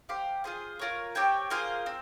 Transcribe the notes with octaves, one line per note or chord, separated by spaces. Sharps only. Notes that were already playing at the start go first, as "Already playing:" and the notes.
G4 C5 F5
F4 G#4 C5
F4 A#4 C#5
C4 G4 C#5 G5
A#3 F4 G#4 C5
C4